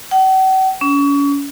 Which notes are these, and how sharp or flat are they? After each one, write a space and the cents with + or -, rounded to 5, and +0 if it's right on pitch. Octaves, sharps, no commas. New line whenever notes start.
F#5 +45
C#4 +35